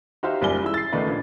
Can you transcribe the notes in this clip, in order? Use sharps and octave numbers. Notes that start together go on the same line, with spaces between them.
D#4 F#4 G4 C5 E5 F5
F#1 C#2 G3 D5 G#5 G7
E4 G#4 E6
A6 C7
C#2 D#3 A3 D#4 B4 D5
A#1